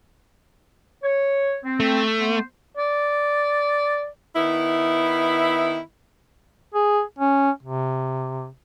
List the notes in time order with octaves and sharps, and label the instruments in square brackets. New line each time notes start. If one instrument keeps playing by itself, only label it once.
[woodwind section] C#5
C4
[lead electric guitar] A3
[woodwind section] A#3 B3 C5
[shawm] D5
[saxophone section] D#3 B3 E4
[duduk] G#4
C#4
C3